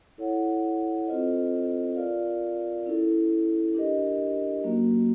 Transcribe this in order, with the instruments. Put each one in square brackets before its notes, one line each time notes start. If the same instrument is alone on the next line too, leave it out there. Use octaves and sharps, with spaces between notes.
[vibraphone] E4 A4 C#5 F#5
C4 F4 A4 C5 D#5
F4 A#4 D5 F5
C#4 E4 A4
D4 G4 A#4 D#5
F#3 A#3 C#4 F#4